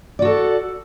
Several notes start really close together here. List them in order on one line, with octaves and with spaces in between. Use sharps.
D5 F#4 A4